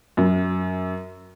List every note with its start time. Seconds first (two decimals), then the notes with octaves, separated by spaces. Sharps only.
0.17 F#2